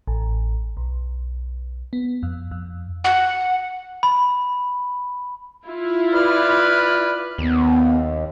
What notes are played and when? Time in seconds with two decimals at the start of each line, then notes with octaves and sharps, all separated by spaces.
0.07 A1
0.77 B1
1.93 B3
2.23 F2
2.51 F2
3.04 F#5
4.03 B5
5.66 E4 F4
6.13 B4 D5 F6
7.38 D#2 B3